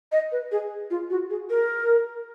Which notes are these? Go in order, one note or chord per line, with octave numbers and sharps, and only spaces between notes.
D#5
B4
G#4
F4
F#4
G#4
A#4